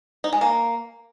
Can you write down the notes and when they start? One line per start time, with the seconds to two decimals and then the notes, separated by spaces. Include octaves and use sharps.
0.24 D#4
0.33 G#3
0.41 A#3